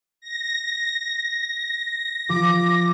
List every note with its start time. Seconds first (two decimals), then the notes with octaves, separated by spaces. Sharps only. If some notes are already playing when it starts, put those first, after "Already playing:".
0.21 A#6
2.29 F3 D6